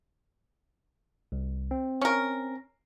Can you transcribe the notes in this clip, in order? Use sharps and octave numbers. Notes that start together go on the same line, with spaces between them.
C2
C4
C#4 A#4